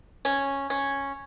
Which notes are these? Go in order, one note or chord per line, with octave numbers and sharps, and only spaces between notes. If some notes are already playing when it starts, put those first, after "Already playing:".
C#4
C#4